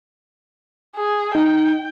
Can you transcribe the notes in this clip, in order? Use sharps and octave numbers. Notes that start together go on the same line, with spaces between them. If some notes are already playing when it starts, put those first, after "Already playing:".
G#4
D#4 G5